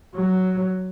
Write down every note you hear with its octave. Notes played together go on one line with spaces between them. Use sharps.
F#3